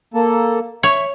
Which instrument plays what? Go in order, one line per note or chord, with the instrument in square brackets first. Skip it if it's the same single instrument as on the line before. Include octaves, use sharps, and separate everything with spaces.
[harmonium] A#3 A4
[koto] C#5 [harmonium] E5